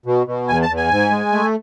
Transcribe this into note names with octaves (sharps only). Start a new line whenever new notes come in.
B2
B2
E2 G#5
A5
E2
G#5
G#2
G#3
A3